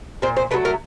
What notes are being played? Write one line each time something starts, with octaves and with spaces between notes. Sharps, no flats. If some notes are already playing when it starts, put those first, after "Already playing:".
A#2 C5
C5
F#3 A3 B4
A#4